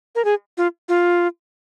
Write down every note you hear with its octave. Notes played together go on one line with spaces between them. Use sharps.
A#4
G#4
F4
F4